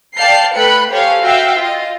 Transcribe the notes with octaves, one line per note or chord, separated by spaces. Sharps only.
D5 F5 G5 A5 G6 C7
A3 B4 G5 B5 F#6 C#7
G4 A4 C5 C#5 F5 G#5
F#4 E5 F5 G5
F4 D#5